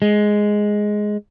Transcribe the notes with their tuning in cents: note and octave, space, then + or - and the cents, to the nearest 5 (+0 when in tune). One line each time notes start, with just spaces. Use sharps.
G#3 +5